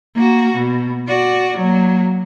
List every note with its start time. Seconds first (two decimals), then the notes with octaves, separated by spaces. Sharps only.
0.15 A#3 F#4
0.57 B2
1.08 F#4 D5
1.58 F#3 A#3